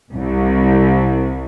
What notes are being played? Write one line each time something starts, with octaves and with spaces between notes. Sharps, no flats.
C2